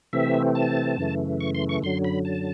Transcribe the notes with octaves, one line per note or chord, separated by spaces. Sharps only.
C3 E3 A3 C4 E5
A5
F#2 C#3 E3 A3
C#6
C6
C#6
F#2 D3 F#3 C6
B5
A5